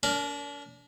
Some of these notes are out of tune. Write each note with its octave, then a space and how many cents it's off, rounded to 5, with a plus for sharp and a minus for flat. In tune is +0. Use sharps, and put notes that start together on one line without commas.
D4 -40 A#4 +0 D5 +0